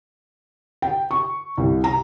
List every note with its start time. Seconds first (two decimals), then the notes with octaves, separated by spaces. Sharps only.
0.82 G5
1.11 C#6
1.57 C2
1.84 A#5